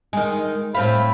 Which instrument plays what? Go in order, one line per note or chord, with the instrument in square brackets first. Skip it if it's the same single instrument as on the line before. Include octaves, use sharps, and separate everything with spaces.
[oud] D#3 G#3
[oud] A2 C4 F5 [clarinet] B5